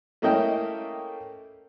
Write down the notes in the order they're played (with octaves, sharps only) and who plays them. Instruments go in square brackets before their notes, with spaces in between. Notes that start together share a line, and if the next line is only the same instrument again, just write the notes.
[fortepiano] A3 A#3 C#4 E4 D#5 G5